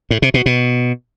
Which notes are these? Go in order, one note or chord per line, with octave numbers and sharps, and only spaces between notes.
A2
C3
B2
B2